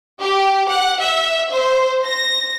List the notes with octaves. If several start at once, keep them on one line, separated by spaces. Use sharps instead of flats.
G4
F#5
E5
C5
A#6